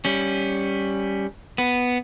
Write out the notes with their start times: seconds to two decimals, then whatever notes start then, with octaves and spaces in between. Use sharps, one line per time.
0.05 G3 C#4
1.58 B3